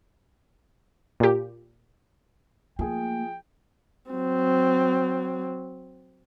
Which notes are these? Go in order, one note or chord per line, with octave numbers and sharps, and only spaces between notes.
A#2 G4
F3 A3 A#3 G#4 G5
F#3 C4